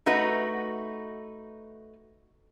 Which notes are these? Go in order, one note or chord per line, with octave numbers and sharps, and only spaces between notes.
A3 D#4 F#4 B4